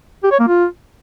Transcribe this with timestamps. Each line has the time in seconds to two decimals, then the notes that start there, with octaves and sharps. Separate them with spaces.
0.23 G4
0.31 C#5
0.40 A#3
0.48 F4